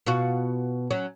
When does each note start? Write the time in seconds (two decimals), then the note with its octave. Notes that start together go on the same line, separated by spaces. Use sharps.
0.06 B2 F4 F#4
0.91 F#3 C#4